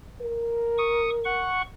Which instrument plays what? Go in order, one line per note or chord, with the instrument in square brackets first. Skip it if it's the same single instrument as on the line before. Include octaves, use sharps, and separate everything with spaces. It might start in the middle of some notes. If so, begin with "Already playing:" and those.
[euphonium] A#4
[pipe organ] C#6 D#6
F#5 C#6